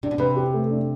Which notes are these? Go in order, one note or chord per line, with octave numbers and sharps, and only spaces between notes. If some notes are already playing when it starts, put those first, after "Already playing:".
C3 D4
B2
C3 B4
G4
A3
D4